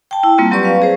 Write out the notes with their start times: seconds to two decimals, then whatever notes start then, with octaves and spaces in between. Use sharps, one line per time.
0.11 G5 A5
0.23 E4
0.38 G3 A#3 C4 F4
0.51 F#3 C4 G4 B4 D5 C#6
0.63 B4 F5
0.82 G#4 C5